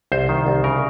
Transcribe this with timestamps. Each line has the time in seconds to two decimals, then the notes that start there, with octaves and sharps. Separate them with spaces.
0.12 C2 C5
0.29 D#3
0.47 C2
0.64 C#3 A#4